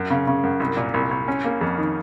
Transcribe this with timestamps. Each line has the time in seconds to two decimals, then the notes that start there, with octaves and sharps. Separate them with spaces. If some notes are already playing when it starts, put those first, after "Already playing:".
Already playing: F#2
0.10 C#3
0.27 C#3
0.43 F#2
0.60 C2
0.77 A#2
0.94 C2
1.11 C2
1.28 C#4
1.44 A#3
1.61 F2
1.78 D#3